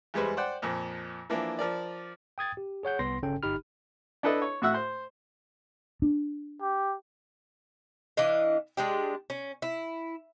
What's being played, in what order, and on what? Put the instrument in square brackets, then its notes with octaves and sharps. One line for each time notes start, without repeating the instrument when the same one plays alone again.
[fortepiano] E2 G3 G#3 B4 C5
C5 D5 F#5 G5
F2 A#2 F3
E3 F3 A#3 D4 E4
F3 A#4 D5
[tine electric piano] G5 D#6 G#6 A6
G4
G#4 C#5 F#5 G6
C2 B3 C6 A#6
G1 C#3 C#4 A4 G5
G1 D#4 G4 B5 F6
[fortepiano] D4 E4 A4 B4 D#5 A5
C#5
A2 F#4 E5 F#5 E6
C5
[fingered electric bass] D4
[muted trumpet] G4
[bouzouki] E3 D4 D#5 F5
G#3 D4 G4
C#4
E4